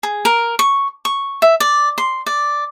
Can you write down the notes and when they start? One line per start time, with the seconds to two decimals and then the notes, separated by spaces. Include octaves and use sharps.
0.03 G#4
0.25 A#4
0.59 C#6
1.05 C#6
1.42 E5
1.60 D5
1.98 C6
2.26 D5